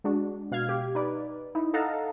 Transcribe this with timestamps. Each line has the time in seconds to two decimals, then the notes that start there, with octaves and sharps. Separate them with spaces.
0.04 G#3 D4 F#4
0.52 B2 F5 F6 G#6
0.69 G4
0.95 D#4 B4 D5
1.55 D#4 E4
1.74 A4 D#5 F5 F#5 A5 A#5